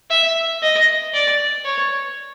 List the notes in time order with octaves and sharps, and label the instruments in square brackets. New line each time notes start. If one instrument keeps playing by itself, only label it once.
[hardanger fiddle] E5
D#5
D5
C#5